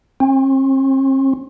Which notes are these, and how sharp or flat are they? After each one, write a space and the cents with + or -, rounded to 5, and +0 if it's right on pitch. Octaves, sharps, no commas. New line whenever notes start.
C4 +45